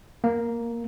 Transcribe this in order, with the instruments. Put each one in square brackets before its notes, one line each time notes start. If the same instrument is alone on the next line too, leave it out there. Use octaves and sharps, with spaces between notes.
[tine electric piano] A#3